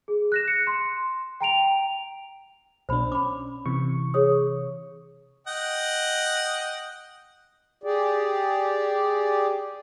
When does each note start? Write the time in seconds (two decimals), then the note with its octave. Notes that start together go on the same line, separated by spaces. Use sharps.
0.08 G#4
0.32 F#6 A#6 E7
0.48 C#7
0.67 C6
1.40 G5 A#5 D7 F7
2.89 B1 B2 D4 C5 B5
3.12 C#4 B5 D6
3.66 C3 E3 C#6
4.14 G#4 C#5 D#6
5.47 D#5 F#5 G5
7.84 G4 G#4 D5